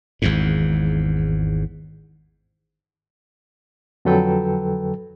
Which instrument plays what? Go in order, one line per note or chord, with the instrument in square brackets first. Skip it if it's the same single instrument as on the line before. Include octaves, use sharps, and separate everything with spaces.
[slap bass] G#1 E2 G#2
[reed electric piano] F2 D3 F#3 A4 B4 G5